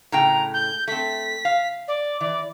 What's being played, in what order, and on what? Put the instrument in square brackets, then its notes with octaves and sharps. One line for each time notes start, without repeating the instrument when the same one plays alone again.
[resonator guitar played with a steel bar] A2 C#3 G5 [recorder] A#5
[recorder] G6
[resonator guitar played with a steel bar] A3 C4 [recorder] B6
[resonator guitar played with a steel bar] F5
[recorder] D5
[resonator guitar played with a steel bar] E3 [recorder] D5